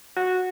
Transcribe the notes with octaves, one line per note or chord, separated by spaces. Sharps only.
F#4